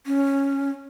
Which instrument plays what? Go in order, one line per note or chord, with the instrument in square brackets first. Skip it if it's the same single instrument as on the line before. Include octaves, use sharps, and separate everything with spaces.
[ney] C#4